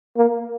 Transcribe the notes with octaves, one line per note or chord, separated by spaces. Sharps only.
A#3